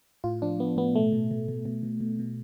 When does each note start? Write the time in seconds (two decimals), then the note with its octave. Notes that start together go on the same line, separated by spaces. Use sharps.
0.24 A2 F4
0.42 F3 D4
0.59 F3 B3
0.77 A2 B3
0.95 B2 A3
1.13 B2
1.31 B2
1.48 B2
1.66 B2
1.83 B2
2.00 B2
2.19 B2